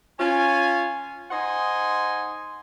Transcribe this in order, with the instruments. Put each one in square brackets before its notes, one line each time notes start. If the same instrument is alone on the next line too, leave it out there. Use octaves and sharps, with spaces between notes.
[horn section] C#4 F4 G#5
D#4 C5 D#5 F#5 G#5 C6